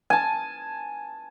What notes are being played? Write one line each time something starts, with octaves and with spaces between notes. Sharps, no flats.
G#5 A5